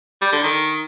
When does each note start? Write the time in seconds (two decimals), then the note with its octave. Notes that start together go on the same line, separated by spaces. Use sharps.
0.22 G3
0.33 D3
0.44 D#3